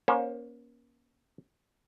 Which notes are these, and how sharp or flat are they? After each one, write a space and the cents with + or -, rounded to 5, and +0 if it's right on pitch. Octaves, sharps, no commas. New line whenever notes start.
A#3 +35 C#4 +5 C5 +25